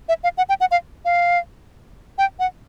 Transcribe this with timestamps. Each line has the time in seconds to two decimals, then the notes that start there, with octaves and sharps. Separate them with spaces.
0.09 E5
0.24 F5
0.38 F#5
0.49 G5
0.60 F#5
0.71 F5
1.05 F5
2.18 G5
2.39 F#5